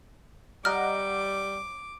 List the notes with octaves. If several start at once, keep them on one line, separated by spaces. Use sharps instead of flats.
G3 D#5 F#5 A#5 D6 F6